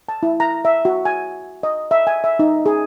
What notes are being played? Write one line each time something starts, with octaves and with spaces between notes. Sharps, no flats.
A5
E4
A#5
E5
F#4
G#5
D#5
E5
G#5
E5
D#4
G#4